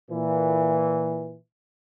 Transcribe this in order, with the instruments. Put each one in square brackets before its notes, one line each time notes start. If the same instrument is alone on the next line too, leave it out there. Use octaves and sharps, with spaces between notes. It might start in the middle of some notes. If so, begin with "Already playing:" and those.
[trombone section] A#2 E3